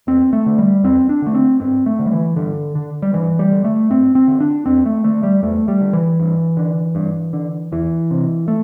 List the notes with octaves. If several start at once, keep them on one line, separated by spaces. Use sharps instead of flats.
E2 C4
A3
D3
G3
E2 C4
D4
D3 A3
C4
G2 C4
A3
D3
G3
E3
G2 D3
D3
G3
G2 E3
G3
D3
A3
G2 C4
C4
D3
D4
E2 C4
A3
D3 A3
G3
E2 A3
G3
D3
E3
G2
D3
G2
D3
E2 E3
C3
A3